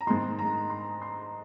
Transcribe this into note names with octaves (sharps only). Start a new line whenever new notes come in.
A#5
G#2 D#3 G#3 C6
A#5
C6
C6